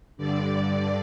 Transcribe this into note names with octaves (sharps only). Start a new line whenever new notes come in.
G2 D3 D5